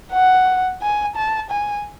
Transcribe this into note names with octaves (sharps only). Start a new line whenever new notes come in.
F#5
G#5
A5
G#5